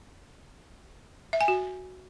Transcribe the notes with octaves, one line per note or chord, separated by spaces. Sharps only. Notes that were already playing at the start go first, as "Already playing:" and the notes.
E5
G#5
F#4